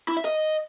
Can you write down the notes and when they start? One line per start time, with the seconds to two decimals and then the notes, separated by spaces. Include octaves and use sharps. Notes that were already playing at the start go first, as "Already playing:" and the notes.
0.08 E4
0.17 E5
0.25 D#5